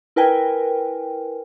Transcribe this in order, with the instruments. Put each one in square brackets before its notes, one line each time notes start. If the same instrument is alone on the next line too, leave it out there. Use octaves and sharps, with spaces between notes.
[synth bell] E4 A#4 B4 G5 G#5